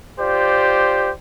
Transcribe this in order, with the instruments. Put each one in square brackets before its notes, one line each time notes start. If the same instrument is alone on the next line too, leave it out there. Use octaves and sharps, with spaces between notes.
[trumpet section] F4 G4 C5 D5